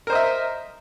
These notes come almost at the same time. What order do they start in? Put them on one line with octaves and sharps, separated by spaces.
A#4 C5 D#5 E5